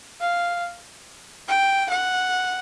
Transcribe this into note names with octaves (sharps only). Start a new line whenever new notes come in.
F5
G5
F#5